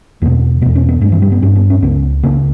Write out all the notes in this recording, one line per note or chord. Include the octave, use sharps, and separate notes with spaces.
E2 B2 A#3
E2 B2 B3
C#4
B3
G2 G#3
E3
G3
B3
G2 C#4
B3
C#4
C#2 C#3 B3
C#2 C#3 A#3